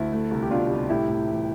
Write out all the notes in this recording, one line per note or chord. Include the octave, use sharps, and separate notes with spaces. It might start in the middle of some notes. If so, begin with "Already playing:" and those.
Already playing: D2 E4
A3
C2
G4
B2 D4 F4
C2
A2 E4 G4
A2
E3